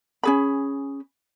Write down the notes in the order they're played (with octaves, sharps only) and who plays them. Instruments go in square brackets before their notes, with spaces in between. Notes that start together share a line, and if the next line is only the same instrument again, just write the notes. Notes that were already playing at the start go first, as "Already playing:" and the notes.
[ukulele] C#4 G#4 B5